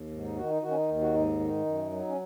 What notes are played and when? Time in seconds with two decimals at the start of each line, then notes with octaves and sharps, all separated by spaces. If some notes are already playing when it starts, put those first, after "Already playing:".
Already playing: D#2
0.11 G#2
0.23 D#4
0.36 D#3 F#4
0.50 D#4
0.62 D#3 F#4
0.70 C#4
0.76 D#4
0.89 D#2
1.01 F#4
1.14 G#2 D#4
1.40 D#3
1.65 F#2
1.91 F#3
2.08 C#4